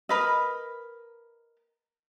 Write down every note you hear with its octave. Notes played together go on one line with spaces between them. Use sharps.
A#4 B4 D#5